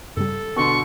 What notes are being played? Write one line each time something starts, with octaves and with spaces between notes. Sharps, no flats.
G2 C#3 G3 A4
B2 D3 C6 C#6